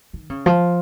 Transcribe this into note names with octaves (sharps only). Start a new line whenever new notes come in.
D#3
C#3
F3